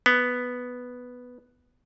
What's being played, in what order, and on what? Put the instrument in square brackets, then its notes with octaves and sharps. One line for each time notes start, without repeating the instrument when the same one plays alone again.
[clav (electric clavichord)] B3